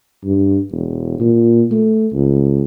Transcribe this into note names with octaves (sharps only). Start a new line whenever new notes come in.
G2
E1
A#2
A3
C#2